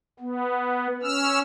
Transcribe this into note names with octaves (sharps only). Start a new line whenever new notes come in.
B3
C#4 E6 F6